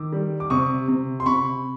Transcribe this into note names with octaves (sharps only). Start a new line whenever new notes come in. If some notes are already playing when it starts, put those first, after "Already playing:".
Already playing: D#3 D6 E6
G3
D6
C3 C#6 D#6
C3
C6
C3 B5 C#6